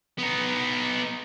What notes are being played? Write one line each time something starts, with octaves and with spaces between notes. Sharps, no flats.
B3 D#4